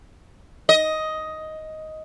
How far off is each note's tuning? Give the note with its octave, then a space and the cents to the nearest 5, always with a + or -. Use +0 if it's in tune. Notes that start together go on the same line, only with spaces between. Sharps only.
D#5 +10